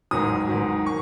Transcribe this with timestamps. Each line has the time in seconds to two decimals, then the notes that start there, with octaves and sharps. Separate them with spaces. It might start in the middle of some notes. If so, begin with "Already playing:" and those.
0.11 A1 G#2 D#3 F#3 D#6
0.48 A1 G#2 D#3 F#3
0.86 C#6